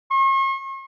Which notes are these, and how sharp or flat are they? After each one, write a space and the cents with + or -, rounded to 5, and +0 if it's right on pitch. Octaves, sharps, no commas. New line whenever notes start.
C#6 -45